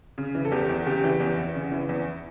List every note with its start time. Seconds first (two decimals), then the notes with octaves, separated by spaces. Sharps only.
0.18 C#3
0.35 E3
0.45 A4
0.52 E2 G4
0.69 E2
0.86 C#3 G4
1.04 E3
1.20 E2
1.38 E2
1.55 C#3
1.72 E3
1.89 E2